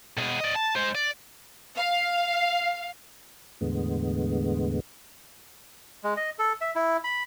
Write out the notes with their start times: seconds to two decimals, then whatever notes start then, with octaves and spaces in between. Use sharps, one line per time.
0.18 B2 G#4
0.40 D5 D#5
0.56 A5
0.76 G#3 C5
0.95 D5
1.76 F5
3.61 E2 A2 D3 G#3 B3
6.04 G#3
6.17 D#5
6.39 A4
6.61 E5
6.76 E4
7.04 B5